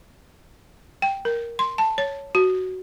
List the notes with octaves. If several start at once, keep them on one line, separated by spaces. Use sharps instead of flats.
G5
A#4
C6
A5
C#5
F#4